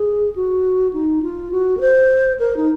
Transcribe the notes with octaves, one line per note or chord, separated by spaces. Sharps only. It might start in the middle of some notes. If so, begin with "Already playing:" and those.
Already playing: G#4
F#4
D#4
F4
F#4
A#4
C5
A#4
D#4